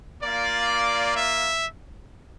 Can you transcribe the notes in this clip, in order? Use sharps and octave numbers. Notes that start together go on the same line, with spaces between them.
A#3 F4 D5
E5